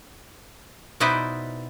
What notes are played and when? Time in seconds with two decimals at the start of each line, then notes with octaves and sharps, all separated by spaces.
1.00 B2 D#4 E4 B4 C5 D5